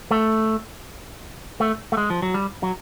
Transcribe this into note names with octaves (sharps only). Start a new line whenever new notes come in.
A3
A3
A3
G#3
F3
F#3
G3
F#3